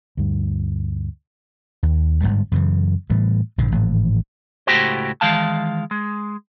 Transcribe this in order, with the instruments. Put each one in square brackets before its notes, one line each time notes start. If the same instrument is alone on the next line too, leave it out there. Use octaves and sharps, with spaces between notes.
[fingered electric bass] D2 G2
[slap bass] D#2
G1 F2 G#2 G3
F#2 C#3 E3
A2 E3 G3
A#1 G2 D3
G#1 A2 E3 F3
[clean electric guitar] C#2 A2 A3 F#4 G4 C5
D#3 E3 G#3 F5 A5
G#3